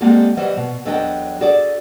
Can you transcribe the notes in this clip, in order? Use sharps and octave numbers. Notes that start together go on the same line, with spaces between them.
G3 G#3 A#3 C4 F#4 A4
E3 F#3 G3 C5 D#5 E5
B2
E2 F#3 D4 A4 D#5 G5
F#4 G#4 A4 D5